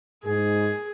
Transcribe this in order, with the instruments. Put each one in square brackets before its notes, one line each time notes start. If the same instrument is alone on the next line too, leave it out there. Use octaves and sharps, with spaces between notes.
[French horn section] G#2 [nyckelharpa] G#4